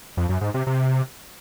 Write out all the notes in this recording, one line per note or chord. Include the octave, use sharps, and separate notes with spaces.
F2
F#2
G#2
C3
C3